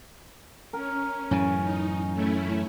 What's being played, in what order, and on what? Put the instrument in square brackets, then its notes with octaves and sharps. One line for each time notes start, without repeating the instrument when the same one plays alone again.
[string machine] C#4 [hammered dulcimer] A#4
[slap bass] F#2 A2 E3 [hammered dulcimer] C#3
[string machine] D#4
A3 C#4 E4